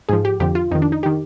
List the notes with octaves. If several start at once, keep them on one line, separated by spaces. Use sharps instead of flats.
G#2 F3 G#4
G4
F2 D3 F3 G4
F4
F2 D#3 D#4
D4
D#4
D#3 G4